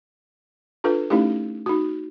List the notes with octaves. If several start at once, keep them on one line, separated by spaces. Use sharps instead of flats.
D4 F4 A4 B4
A3 C#4 D#4 E4 G4
D#4 F#4